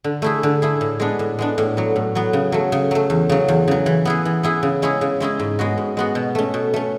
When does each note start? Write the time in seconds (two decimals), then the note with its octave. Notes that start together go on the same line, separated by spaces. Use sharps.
0.04 D3
0.22 A3 E4 G#4
0.43 D3
0.62 A3 E4 G#4
0.81 A2
1.00 G#3 B3 D4
1.19 A2
1.39 G#3 B3 D4
1.58 A2
1.77 F#3 B3
1.96 A2
2.15 F#3 B3
2.33 C#3
2.52 F#3 A3
2.72 C#3
2.91 F#3 A3
3.10 E2
3.29 C#3 F#3
3.48 E2
3.68 C#3 F#3
3.86 E3
4.05 B3 E4 G#4
4.25 E3
4.43 B3 E4 G#4
4.63 C#3
4.82 G#3 C#4 E4 G#4
5.01 C#3
5.20 G#3 C#4 E4 G#4
5.39 G#2
5.59 G#3 B3 F#4
5.78 G#2
5.97 G#3 B3 F#4
6.15 B2
6.35 A3 C#4
6.54 B2
6.74 A3 C#4